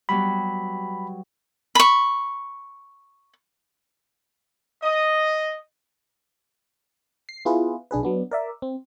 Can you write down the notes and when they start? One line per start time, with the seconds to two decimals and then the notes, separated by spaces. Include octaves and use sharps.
0.09 F#3 G3 B3 B5
1.75 B5 C#6
4.82 D#5
7.29 C7
7.45 B3 E4 F4 G#4 B4
7.91 B1 D4 G#4 B4
8.03 F#3 B3 D4
8.31 A#4 D5 E5
8.62 C4